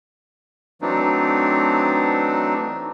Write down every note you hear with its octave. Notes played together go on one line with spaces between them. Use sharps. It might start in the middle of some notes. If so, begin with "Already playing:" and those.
E3 F#3 A3 C4 D4 D#4